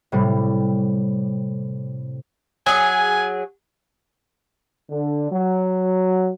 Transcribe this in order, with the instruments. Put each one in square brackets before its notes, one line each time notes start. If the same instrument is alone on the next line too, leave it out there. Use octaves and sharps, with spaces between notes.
[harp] A2 C3 G3
[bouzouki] F#3 G#4 [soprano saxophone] G#5
[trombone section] D3
F#3